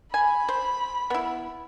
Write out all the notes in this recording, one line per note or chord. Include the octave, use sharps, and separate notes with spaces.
G#5 B5
C5
B3 E4